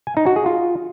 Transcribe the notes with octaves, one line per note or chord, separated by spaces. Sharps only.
G#5
D#4
F#4
G#4
F4